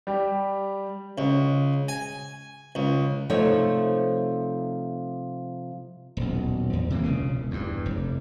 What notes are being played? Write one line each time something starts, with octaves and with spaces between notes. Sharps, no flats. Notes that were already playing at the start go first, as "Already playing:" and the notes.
G3 G4
C#2
G#5
C#2
C3 F3 A3 D#4 C5 C#5
D#1 B1
E2
C3 E3 A#3
E1 C#2 C#3
E2 G2
F1